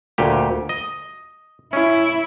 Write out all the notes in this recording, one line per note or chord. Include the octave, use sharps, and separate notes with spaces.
D2 A#2 G4
D#5
C#4 E4